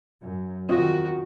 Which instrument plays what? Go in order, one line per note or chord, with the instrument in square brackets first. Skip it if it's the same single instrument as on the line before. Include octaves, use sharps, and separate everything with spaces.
[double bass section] F#2
[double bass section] E2 D#3 [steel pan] C4 F4 D#5 [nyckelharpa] F#4